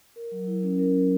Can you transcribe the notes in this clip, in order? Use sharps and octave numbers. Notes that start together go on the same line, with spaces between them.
A#4
F#3
E4
C#4
A#4
F#3